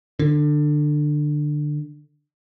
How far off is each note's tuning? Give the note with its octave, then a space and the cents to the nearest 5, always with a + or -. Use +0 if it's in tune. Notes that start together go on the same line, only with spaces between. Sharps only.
D3 +20